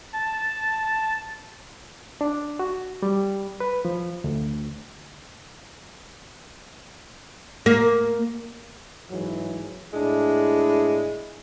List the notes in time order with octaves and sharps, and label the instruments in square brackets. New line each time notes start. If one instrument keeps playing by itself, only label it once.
[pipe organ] A5
[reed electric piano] D4
F#4
G3
B4
F3
D2
[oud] A#3
[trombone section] G#2 E3 F#3
[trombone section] A2 D4 E4 [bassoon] G#3